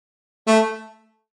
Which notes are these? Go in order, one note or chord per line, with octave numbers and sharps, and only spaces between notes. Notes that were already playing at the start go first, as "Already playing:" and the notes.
A3